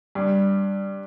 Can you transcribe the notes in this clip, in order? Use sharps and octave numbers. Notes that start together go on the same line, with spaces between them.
G2